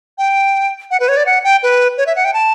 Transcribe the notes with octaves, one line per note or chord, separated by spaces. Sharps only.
G5
F#5
B4
C#5
D5
F#5
G5
B4
C#5
E5
F#5
G5
A5